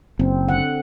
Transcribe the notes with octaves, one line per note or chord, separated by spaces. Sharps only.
F#1 C4
D3 F#5